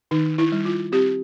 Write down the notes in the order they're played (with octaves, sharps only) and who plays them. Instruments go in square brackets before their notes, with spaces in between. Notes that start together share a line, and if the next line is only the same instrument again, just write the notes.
[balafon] D#3 D#4
E4
G3
F4
C4 G4